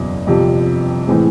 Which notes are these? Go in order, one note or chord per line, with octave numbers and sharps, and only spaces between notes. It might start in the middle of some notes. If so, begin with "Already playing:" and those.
Already playing: F#1 E2 B2 F#3
G1 F2 C3 F3
A2 E3 G#3 C4